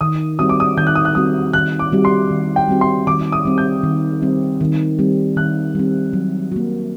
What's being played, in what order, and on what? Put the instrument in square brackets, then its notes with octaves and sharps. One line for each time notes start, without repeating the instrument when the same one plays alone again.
[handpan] D#3 [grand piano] D#6
[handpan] G3 C4 F#4 [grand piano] D#6
[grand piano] D6
D#6
[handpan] D#3 [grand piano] G6
[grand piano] F#6
D#6
F#6
[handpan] G3 C4 F#4 [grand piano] D#6
[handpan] D#3 [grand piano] F#6
[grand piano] D6
[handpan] G3 C4 F#4
[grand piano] C6
[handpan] D#3
[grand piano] G5
[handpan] G3 C4 F#4
[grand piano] C6
[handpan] D#3 [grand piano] D6
[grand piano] D#6
[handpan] G3 C4
[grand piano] G6
[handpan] D#3
G3 C4
D#3
G3 C4
[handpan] D#3 [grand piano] F#6
[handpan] G3 C4
F#3
A#3 F#4